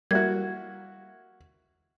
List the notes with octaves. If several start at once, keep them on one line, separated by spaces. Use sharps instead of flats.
G3 A#3 E4 F#4 G#6